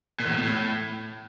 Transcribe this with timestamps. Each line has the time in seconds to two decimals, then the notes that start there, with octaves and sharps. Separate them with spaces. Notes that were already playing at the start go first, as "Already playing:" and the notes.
0.20 A#2
0.25 E2
0.31 A2
0.37 B2
0.43 A2